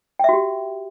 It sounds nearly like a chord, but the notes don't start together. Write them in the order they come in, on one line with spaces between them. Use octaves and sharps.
G5 E5 F#4 G4